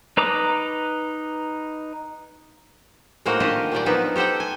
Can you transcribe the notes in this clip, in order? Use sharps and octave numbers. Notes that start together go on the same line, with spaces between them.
D#4 B4 A#5 D6 D#6
A2 G#3 A#3 D#4 F#4 C5
D#3 C#4 D4 F4 G4 D#5
A#2 F#3 G3 D5
F3 B3 D4 D#4
G4 A4 C5 F#5 G5
G#5